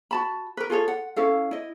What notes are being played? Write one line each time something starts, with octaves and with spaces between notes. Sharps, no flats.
F#4 A5 B5
A#4 B4
F4 G#4 A4 C#5
F#5
C#4 E4 A4 F5
E4 D#5